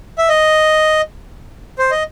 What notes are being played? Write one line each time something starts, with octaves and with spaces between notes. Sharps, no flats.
E5
D#5
C5
D#5